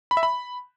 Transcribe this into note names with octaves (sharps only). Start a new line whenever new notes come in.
B5
E5
B5